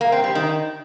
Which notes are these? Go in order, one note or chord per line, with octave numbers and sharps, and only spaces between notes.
A#3
C4
G3
D#3